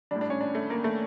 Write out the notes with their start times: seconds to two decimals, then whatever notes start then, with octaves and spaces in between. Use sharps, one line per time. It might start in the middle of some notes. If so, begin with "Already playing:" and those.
0.11 A2 G3 D4
0.21 D4
0.30 C#4
0.41 D4
0.55 A3
0.70 A#3
0.84 A3